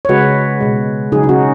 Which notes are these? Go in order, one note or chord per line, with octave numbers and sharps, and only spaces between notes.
C#5
C#3 G#3 F#4 B4
B2 G#3
C#3 F#3 D#4 G#4
D#4
C#4 F#4